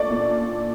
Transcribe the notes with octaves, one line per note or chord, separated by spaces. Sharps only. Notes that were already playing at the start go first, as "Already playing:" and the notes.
Already playing: A#2 A3 D4 D5 C#6
A#2